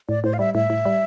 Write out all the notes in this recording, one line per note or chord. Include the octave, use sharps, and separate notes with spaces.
A2 D5
A2 C5
F5
G3 E5
A2 E5
A2
G3